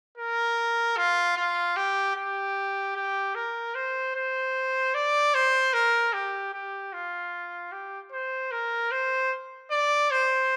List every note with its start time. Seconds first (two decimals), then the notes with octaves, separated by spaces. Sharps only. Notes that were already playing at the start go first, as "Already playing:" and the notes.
0.18 A#4
0.97 F4
1.37 F4
1.76 G4
2.16 G4
2.96 G4
3.35 A#4
3.75 C5
4.15 C5
4.94 D5
5.35 C5
5.74 A#4
6.13 G4
6.53 G4
6.93 F4
7.72 G4
8.12 C5
8.51 A#4
8.92 C5
9.71 D5
10.11 C5